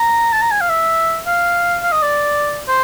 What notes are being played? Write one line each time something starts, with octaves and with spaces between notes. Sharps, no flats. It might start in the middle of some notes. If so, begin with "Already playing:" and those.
Already playing: A#5
A5
A#5
G#5
F5
E5
F5
F5
D#5
D5
C5